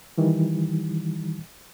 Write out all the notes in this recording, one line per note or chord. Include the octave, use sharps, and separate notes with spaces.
D#3 E3 G3